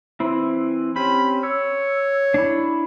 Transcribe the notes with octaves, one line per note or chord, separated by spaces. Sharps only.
E3 C4 E4
C4 C#4 G4 B5
C#5 E6
D4 E4